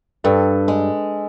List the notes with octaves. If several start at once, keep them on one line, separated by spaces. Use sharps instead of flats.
G2 A4 B4
G#3